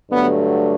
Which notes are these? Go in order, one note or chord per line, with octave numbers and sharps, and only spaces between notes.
G2 D3 F#3 A3 B3